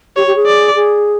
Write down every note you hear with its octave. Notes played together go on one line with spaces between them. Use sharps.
G4 C#5
G4
G#4
D5
G#4